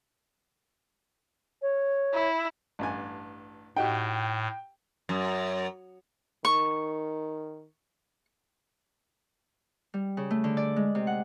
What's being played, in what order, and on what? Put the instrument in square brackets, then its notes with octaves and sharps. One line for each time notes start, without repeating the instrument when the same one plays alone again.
[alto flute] C#5
[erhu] E4
[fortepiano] A1 G2 G#5
[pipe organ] A2 [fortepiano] D#4 F#4 G4 [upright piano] G5
[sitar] F#2
[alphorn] D#3 [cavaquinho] C#6
[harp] G3
C#3
A3
D3
D5
G#3
C3
F#5